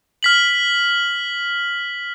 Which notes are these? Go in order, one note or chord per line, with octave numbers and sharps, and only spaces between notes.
F6 B6 F#7